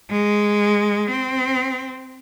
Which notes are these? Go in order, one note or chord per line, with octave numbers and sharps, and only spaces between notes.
G#3
C4